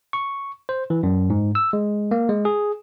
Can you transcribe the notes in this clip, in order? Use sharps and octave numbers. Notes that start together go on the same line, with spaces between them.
C#6
C5
E3
F#2
G#2
E6
G#3
A#3
G#3
G#4